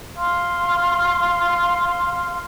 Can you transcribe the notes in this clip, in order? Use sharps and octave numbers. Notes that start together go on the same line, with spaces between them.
F5 C6 F6